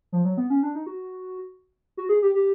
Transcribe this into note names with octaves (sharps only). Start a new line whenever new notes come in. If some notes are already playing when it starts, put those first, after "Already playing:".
F3
F#3
B3
C#4
D4
D#4
F#4
F#4
G#4
G4
G4